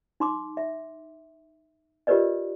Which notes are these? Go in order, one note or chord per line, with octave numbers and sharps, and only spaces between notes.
D#4 C6 D6
E5
F4 G4 A#4 B4 D5 D#5